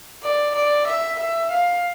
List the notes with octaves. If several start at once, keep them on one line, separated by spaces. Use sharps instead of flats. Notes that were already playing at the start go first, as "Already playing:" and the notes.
D5
D5
E5
E5
F5